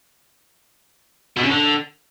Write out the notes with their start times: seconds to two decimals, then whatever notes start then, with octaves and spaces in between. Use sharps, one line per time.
1.37 B2
1.43 C#3
1.50 D3